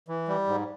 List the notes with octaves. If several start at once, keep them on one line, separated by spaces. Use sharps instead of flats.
E3
G3
G#2